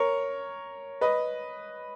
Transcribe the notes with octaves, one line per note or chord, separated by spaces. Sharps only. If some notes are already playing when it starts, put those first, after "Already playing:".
Already playing: A#4 C#5
B4 D#5